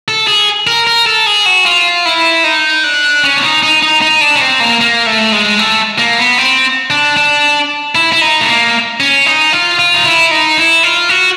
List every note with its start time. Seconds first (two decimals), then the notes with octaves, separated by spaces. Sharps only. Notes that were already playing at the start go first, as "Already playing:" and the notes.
0.08 A4
0.27 G#4
0.67 A#4
0.87 A#4
1.06 A4
1.26 G#4
1.46 F#4
1.65 F4
2.06 E4
2.44 D#4
2.84 D4
3.24 C#4
3.37 D4
3.43 D#4
3.63 D#4
3.82 D#4
4.02 D#4
4.21 D4
4.35 C#4
4.41 C4
4.60 A#3
4.81 A#3
5.06 A3
5.32 G#3
5.59 A3
5.98 A#3
6.18 B3
6.38 C4
6.90 D4
7.17 D4
7.95 E4
8.13 E4
8.21 D#4
8.41 A3
8.48 A#3
9.00 C#4
9.26 D#4
9.53 F4
9.79 F4
9.94 D#4
10.06 E4
10.31 D#4
10.58 E4
10.83 F4
11.09 F#4